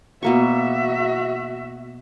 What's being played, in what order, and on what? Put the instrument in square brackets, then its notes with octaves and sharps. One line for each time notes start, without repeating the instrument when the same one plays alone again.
[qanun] B2 A#3 C#6 [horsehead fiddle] F#4 E5